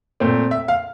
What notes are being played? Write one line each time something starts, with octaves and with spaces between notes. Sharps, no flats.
A#2 A3 C4
E5
F5